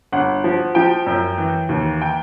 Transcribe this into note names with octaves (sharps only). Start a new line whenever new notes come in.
G1 F#5
F3
F3 G5
F#2
E3
D#2
G5